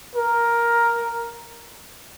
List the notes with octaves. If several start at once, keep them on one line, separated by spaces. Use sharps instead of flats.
A#4